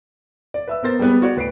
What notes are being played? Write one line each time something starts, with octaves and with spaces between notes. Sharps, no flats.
D5
B4 E5 E6
B3 A#4 C5 A6
G3 G#3 B3 B4
F#4 C#5 D5
D1 B4 C7 D7